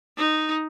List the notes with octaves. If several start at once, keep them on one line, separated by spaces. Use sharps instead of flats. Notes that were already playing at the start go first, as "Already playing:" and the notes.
D#4